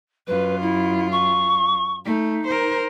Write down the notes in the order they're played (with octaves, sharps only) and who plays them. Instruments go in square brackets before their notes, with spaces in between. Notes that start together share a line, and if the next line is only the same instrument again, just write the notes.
[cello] F#2 F4 [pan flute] B4
[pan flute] E4
C#6
[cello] A3 [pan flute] D#4
[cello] A#4 C5